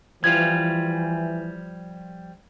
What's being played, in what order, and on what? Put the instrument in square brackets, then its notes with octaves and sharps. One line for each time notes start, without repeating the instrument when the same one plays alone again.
[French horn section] E3 [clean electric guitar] F3 G3 F4 [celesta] G#6